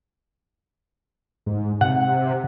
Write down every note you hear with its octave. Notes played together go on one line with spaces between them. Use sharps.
G#2
C3 F#5